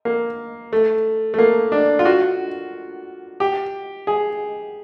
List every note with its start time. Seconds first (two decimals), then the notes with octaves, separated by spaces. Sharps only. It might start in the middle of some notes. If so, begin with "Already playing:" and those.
0.05 A#3
0.73 A3
1.34 A3
1.39 A#3
1.72 D4
1.99 F4
2.05 F#4
3.40 G4
4.07 G#4